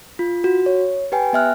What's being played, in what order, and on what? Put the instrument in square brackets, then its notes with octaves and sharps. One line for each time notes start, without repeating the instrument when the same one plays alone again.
[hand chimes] F4
F#4
C#5
G4 B4 G5 G#5
B3 E5 F6 F#6